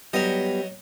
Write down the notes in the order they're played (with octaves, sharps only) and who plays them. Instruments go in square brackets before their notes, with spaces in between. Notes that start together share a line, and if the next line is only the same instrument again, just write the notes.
[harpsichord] F#3 D#5 [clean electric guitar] G3 B3